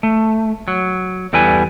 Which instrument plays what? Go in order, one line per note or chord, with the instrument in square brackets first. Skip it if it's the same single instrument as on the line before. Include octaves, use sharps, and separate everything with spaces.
[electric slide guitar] A3
F#3
E2 G3 A4 B4 G#5